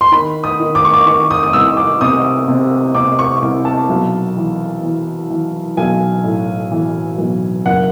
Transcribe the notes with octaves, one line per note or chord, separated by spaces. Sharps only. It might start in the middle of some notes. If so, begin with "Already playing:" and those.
C6
D#3 B5
D#6
D#3
D6
C#6
D6
D#3 C#6
D#6
D#6
C2 E6
D6
C3 D#6
C3
C3 D6
C#6
C2
A5
B1
E3
E3
E3
B1 G#5
A2
E3
B1
F#1 F#5